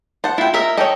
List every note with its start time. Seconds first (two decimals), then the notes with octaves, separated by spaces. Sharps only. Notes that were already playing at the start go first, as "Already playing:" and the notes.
0.24 C5 F#5 A5
0.38 E4 F4 G5
0.54 A#4 D#5 E5
0.77 A4 C#5 D#5 G5